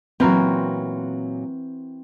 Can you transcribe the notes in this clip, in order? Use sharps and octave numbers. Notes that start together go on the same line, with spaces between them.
A#2 E3 F#3 C4 F#4 A#4